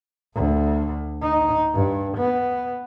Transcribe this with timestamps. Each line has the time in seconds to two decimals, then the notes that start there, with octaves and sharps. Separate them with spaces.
0.35 D2
1.22 D#4
1.74 G2
2.17 B3